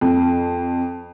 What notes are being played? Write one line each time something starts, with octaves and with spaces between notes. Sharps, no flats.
F2